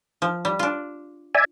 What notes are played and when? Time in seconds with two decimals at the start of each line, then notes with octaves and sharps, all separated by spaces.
0.22 F3
0.45 G3
0.59 D4 F4
1.35 D5 E5 G#5